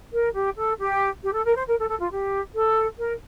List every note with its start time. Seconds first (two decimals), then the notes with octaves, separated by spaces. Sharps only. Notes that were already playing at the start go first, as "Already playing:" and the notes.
0.13 A#4
0.35 G4
0.57 A4
0.79 G4
1.24 G4
1.34 A4
1.45 A#4
1.56 C5
1.67 A#4
1.79 A4
1.89 A4
2.01 F4
2.11 G4
2.55 A4
2.99 A#4